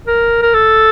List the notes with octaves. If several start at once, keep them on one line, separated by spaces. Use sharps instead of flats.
A#4
A#4
A4